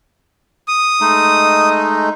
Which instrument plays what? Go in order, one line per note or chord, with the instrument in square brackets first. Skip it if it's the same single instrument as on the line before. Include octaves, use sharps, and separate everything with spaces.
[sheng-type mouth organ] D#6
[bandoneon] G#3 A3 D#4